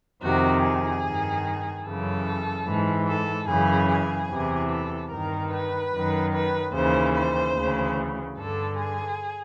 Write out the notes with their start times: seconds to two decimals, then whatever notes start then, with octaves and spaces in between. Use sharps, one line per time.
0.22 F2 C3 D#3 F#4
0.62 G#4
1.03 G2 D#3
1.85 F#2 C#3 E3 A4
2.66 G#2 E3
3.07 A4
3.47 F#2 C#3 E3 G#4
3.88 G#4
4.29 E2 C3 E3
4.69 A4
5.10 G2 D#3 A#4
5.51 B4
5.92 F#2 D#3
6.32 B4
6.73 D#2 C#3 E3 C5
7.14 C5
7.54 D2 C#3 E3
8.36 G2 D3 A4
8.77 G#4